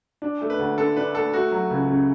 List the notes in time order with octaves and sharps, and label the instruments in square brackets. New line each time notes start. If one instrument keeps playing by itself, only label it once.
[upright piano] D4
A3
[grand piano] B4
[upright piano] D2
[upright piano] D3 [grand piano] A4
[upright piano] D4 [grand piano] B4
[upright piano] A3 [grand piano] A4
[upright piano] A3 [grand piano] F#4
[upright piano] F#3
C#2
C#3